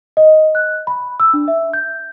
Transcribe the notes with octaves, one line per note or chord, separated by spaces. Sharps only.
D#5
F#6
B5
E6
D4
E5
G6